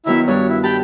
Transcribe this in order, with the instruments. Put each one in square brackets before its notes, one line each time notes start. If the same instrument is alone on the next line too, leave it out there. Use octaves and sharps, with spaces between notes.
[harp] D#3 F#3 B3 [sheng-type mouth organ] E4 E5
[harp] G2 [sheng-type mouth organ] C#5
[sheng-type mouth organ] E4
[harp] G4 A5 [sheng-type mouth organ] G5 B5